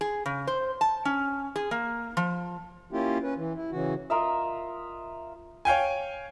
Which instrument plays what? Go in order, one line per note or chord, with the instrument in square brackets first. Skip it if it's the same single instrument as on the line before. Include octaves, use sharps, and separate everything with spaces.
[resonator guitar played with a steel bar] G#4
C#3
C5
A5
C#4
G#4
A#3
F3
[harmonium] A#3 C#4 E4 F4 G4
C#4 B4
E3
E4
C#3 E3 F#4
[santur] F4 A#4 D#5 E5
[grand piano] C#5 F5 G5 G#5